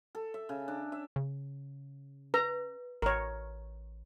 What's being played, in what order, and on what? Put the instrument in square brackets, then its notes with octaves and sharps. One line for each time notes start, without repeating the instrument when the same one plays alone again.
[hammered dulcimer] A4
E5
C#3
D4
E5
[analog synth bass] C#3
[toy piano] B4 [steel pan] A#5
[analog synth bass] A1 [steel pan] A#4 C#5